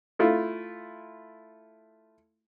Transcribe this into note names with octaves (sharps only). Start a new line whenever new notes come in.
A3 E4 F4